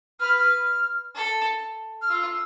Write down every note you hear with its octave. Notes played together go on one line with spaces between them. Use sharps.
B4 F6
F6
A4
F6
F4 E6